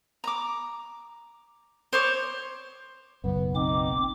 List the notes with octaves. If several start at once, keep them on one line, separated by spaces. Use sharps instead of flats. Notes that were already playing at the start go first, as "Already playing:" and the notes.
A#5 D6
C5 C#5 D6
F#1 B1 B3
C4 D#4 D6